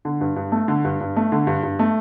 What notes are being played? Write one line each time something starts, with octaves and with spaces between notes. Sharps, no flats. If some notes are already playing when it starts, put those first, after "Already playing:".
D3
G2
G2
A3
D3
G2
G2
A3
D3
G2
G2
A3